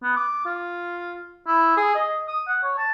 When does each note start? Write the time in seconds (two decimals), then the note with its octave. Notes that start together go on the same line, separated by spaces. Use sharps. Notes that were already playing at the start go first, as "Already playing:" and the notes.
0.03 B3
0.17 D6
0.46 F4
1.47 E4
1.77 G#4
1.95 D#5
2.28 D#6
2.48 F#5
2.64 C#5
2.78 A5